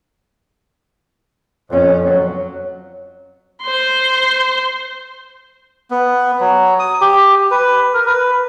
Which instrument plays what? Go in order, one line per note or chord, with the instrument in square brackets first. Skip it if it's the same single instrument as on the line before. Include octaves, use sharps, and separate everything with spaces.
[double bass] F2 C#4
F#3
[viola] C5 C6
[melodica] B3
F#3
D#6
G4
B4
A#4
B4